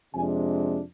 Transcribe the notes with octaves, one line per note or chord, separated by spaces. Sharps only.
F2 C3 G#3 D4 G#5